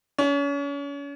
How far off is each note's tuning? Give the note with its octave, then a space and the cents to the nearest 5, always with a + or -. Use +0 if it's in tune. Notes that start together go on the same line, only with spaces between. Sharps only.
C#4 +35